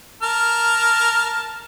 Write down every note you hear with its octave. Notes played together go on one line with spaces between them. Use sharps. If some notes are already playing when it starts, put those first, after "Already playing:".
A#4 A5 F6